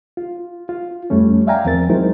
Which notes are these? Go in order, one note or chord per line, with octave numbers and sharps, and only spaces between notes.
F4
F4
F2 G3 A3 C#4
D5 E5 F5 G5 G#5 A#5
E2 F3 C4 A#4 A6
F#3 G#3 D#4 E4 A#4 C5